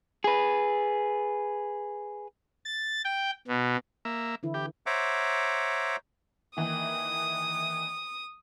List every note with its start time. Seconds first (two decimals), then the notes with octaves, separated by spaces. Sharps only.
0.24 G#4 B4
2.65 A6
3.05 G5
3.48 B2
4.05 A#3 E5
4.43 D3 E3 E4
4.54 G4
4.86 C5 C#5 E5 F#5 A#5 D6
6.57 D#3 E3 A#3 D#6